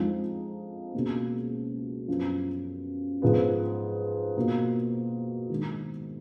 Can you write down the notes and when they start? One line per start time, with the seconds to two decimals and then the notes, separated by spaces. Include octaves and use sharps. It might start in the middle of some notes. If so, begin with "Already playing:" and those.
Already playing: F2 F3 G#3 D#4
0.94 C#2 B2 A#3
2.08 F#2 F3 B3
3.22 G#2 F3 B3
4.36 B2 A#3 F4
5.49 D#3 G#3 D#4